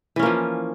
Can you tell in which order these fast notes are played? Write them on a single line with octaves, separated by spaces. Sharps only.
E3 C#4 A#3 F3